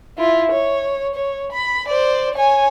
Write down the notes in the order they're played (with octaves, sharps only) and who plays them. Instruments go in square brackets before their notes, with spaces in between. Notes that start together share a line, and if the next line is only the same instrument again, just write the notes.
[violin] E4 F4
C#5
C#5
B5
C5 D5
C#5 G#5